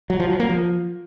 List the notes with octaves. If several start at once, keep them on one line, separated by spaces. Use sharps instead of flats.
F#3
F3
F#3
A#3
F3